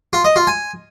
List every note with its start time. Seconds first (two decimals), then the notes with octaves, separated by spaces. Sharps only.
0.13 F4
0.25 D#5
0.36 F4
0.47 G#5